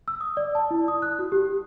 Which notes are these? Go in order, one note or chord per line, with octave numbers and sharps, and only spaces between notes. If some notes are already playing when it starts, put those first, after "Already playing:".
E6
D#6
D5
A5
E4
D#6
F#6
F#4
G4